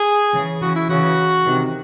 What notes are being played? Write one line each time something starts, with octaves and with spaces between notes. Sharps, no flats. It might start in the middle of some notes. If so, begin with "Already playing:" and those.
Already playing: G#4
C#3 E3
C#3 E3 F#4
E4
C#3 E3 F#4
C3 D#3